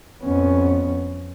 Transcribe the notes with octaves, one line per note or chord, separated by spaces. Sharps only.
F2 B3 C#4